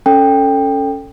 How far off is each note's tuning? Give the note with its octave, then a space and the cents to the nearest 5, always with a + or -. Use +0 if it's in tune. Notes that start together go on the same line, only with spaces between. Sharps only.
C#4 +0 A4 +10 G5 +15